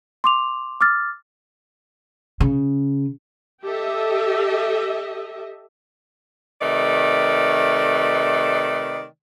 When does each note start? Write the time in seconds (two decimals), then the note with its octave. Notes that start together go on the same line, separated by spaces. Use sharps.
0.24 C6 D6 F7
0.81 D6 E6 F6 A6
2.40 C#3
3.65 G4 A4 D#5 E5
6.62 C3 D#3 A3 B4 D5